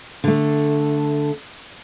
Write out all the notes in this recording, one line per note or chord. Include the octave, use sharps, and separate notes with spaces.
D3 A3